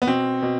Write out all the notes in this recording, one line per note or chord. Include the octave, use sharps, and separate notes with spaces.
B3
B2 C4
B2